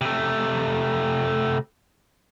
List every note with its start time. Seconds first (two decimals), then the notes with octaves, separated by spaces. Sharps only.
0.01 C3 A3